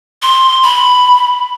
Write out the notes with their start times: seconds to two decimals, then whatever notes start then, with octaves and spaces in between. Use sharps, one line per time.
0.23 C6
0.63 B5